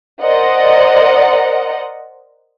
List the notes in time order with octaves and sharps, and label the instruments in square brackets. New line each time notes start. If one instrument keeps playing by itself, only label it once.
[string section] A#4 C5 D5 D#5 F#5